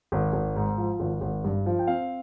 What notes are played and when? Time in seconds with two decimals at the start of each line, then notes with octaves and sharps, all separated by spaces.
0.12 G#1
0.33 G#1
0.56 G#2
0.78 F3
1.00 G#1
1.21 G#1
1.44 G2
1.66 F3
1.79 G5
1.87 C4 F5